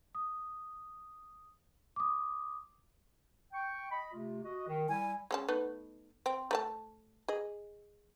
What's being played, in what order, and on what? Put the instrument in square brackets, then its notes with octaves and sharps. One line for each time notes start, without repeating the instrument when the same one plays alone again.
[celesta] D#6
D6 D#6
[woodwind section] G5 C#6
D#5 B5
C3 A3 F4
F#4 D#5
D#3
[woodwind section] G3 E4 [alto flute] G#5
[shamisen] G#3 C#4 A5
A3 B3 D#4
C4
A3 B4 A5
G#4 D#5